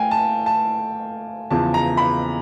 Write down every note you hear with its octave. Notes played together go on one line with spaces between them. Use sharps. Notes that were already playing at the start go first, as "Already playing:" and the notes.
Already playing: A3 F5 G5 G#5
A5
A5
E2 C#3 F3 A5
A#5
B5